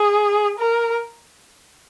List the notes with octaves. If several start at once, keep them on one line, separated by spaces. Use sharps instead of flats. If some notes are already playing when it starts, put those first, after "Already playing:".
Already playing: G#4
A#4